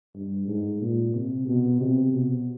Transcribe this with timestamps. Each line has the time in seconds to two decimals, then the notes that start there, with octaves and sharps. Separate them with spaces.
0.16 G2
0.48 G#2
0.81 A#2
1.14 C3
1.47 B2
1.81 C3
2.13 B2